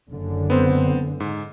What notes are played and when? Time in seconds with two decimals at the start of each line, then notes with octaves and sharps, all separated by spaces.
0.10 F#1 F#2 D3
0.50 B3 C4 C5
1.20 G#2